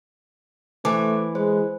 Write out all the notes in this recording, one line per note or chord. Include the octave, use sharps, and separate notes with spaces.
E3 A3 C5 A5 D6
G#3 C5